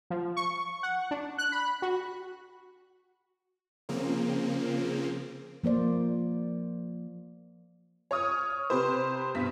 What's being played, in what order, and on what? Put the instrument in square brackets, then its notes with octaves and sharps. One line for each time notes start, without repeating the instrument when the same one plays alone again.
[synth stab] F3
C#6
F#5
D4
F#6
B5
F#4
[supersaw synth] C#3 F3 A#3 C4
[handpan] F3 A#3 C5 D5
[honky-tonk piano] C#5 C#6 D#6 F6
C3 G4 B4 C5
G2 B2 B6